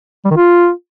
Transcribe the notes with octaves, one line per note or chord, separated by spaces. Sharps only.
G3
D#3
F4